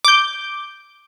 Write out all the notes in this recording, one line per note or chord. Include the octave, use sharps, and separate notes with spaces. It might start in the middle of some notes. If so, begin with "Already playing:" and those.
D6 G6